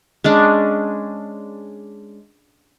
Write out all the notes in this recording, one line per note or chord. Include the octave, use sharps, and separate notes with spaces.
G#3 C#4 D4